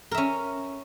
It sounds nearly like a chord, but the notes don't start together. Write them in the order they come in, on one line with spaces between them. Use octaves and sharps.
A#4 E5 C#4